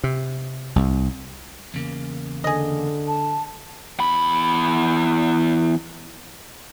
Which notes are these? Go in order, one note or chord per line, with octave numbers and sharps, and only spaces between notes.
C3
C2
E2 C#3 A#3
D3 G#4 D#5
A5
E2 B5